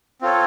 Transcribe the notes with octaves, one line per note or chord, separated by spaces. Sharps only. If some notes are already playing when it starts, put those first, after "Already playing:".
C4 F4 A4 C#5